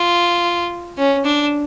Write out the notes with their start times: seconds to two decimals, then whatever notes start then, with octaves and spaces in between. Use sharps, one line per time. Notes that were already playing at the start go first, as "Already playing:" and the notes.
Already playing: F4
0.97 C#4
1.25 D4